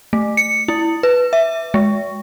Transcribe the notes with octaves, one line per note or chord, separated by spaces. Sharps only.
A3
C#7
E4
B4
E5
G#3